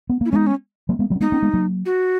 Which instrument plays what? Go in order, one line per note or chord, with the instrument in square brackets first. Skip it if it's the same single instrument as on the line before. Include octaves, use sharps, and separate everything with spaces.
[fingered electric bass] B3
[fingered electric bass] A#3 [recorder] E4
[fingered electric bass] G#3 B3 [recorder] C#4 D#4
[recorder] C#4
[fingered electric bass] F#3 A#3
G#3 B3
F#3 A#3
C#4
[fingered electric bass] G#3 B3 [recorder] D#4
[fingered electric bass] A#3 C#4
G#3 B3
F#3 A#3
[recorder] F#4